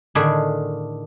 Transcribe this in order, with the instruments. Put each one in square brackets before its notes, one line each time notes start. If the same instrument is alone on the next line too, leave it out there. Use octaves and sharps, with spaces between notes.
[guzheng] A2 D3 D#3 D4 G#4 B5